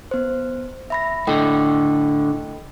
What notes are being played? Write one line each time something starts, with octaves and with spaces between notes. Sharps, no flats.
B3 C5
E5 B5 A#6
A2 D3 A4 D#5 G5